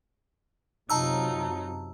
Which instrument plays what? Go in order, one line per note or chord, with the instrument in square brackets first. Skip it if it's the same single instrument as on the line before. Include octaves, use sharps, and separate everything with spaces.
[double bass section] F#2 C3 F#3 [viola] D#4 F4 [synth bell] A5 A#5 E6